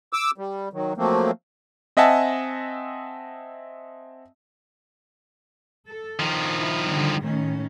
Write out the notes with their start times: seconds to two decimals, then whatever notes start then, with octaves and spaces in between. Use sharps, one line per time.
0.13 D6 E6
0.38 G3
0.73 D#3 F#3
0.97 F3 F#3 A3 A#3 C4
1.97 C4 D#5 E5 F#5 G#5 A5
5.87 A4
6.19 D#3 F3
6.58 E4
6.89 D3 G3
7.18 A2 D#3 C#4